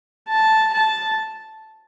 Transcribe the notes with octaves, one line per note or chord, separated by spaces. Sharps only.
A5
A5